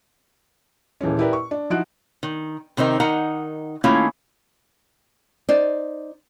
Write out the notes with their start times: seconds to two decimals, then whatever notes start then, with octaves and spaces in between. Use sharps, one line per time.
1.01 D#1 E3 G#3 C#4
1.19 E4 G4 A#4 B4 D5
1.33 C#6
1.51 D4
1.70 F3 D#4 E4 F#4 F#6 D7
2.23 D#3
2.77 C3 D#3 C4 D#4 A#4
3.00 D#3 D#4 A#4 F#5 A#5
3.84 D#3 A3 A#3 C#4 E4 F4
5.49 D#4 C5 D5